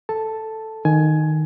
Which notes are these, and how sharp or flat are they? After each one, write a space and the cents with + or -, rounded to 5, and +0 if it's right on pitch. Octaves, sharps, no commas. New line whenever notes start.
A4 +0 A5 +0
D#3 -5 G#5 +15